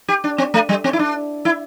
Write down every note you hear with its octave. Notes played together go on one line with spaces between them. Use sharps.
G4
D4
C4
A3
G3
C4
E4
D4
E4